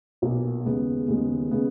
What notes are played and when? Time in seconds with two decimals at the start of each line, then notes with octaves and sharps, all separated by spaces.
0.22 B1 A#2 A#3
0.65 D#2 C#3 G#3 B3
1.08 D#2 C#3 G#3 B3
1.51 C#3 G#3 B3